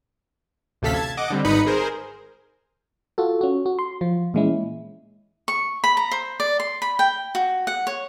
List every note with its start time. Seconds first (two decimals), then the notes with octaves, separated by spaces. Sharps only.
0.82 A1 D2 C3 A4 F5 B6
0.94 A5 G#6
1.17 D#5 F#5 D6
1.30 D3 G3 C4
1.44 G#1 D#4 B4 B5 D#6 C#7
1.67 G#4 A#4 C5
3.18 F4 F#4 A4
3.41 C#4 F#4
3.66 F#4
3.79 C6
4.01 F3 F4
4.34 A#2 E3 G#3 C#4 E4
5.48 C#6
5.84 B5
5.97 A#5
6.12 C5
6.40 D5
6.60 C6
6.82 B5
6.99 G5
7.35 F#4
7.67 F#5
7.87 C#5